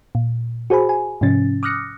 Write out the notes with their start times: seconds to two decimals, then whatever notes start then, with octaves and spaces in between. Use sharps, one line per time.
0.15 A#2
0.70 F#4 G#4 C5 G#5 B5
0.89 G#5
1.21 G#2 C3 F3 C#4 A6
1.63 D6 D#6 F6 F#6 A#6 C#7